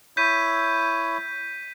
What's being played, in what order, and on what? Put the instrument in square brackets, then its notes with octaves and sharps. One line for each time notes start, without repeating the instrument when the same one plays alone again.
[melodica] E4 C#5 [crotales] G6 B6 D#7